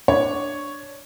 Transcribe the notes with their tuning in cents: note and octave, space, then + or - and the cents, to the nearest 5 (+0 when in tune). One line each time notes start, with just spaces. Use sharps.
D4 +0 C#5 +0